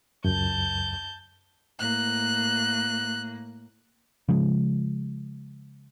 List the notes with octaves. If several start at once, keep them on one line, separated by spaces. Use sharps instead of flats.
C#2 F#2 A5 G6
A2 A#3 F#6
C#3 F3 G#3